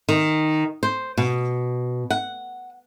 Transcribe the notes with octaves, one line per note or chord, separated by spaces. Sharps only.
D#3
C5
B2
F#5